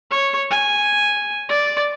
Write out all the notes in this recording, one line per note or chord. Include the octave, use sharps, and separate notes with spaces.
C#5
G#5
D5